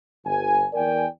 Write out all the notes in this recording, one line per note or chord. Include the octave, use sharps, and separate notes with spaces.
G1 G#5
E2 A#4 D5 G5 G#5